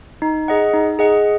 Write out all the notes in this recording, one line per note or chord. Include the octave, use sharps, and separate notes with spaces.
D#4
G#4 D#5 F#5
D#4
G#4 D#5 F#5